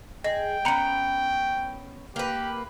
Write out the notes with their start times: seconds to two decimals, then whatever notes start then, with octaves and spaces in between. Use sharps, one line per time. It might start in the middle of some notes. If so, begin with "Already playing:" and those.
0.24 G#4 D#5 G5
0.65 B3 C#4 A#5 B5 C#7
2.16 A#3 G4 B4